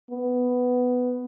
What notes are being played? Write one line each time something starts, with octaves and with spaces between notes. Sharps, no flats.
B3